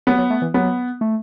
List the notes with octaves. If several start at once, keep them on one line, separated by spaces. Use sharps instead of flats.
F#3 B3
F#3
A3
E3
F#3 B3
A3